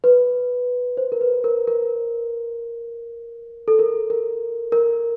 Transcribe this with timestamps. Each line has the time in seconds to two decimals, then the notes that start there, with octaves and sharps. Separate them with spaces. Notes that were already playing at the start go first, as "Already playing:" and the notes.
0.04 B4
0.97 C5
1.12 A#4
1.21 B4
1.44 A#4
1.67 A#4
3.68 A4
3.79 A#4
4.10 A#4
4.72 A#4